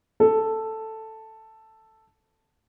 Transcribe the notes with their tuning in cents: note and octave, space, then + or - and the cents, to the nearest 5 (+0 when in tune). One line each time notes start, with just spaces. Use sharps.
A4 +5